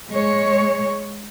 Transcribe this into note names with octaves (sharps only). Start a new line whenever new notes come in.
G#3 C#5